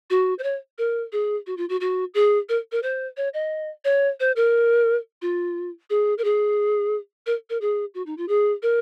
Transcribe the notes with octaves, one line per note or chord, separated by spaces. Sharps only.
F#4
C5
C#5
A#4
G#4
F#4
F4
F#4
F#4
G#4
A#4
A#4
C5
C#5
D#5
C#5
C5
A#4
F4
G#4
A#4
G#4
A#4
A#4
G#4
F#4
D#4
F4
G#4
A#4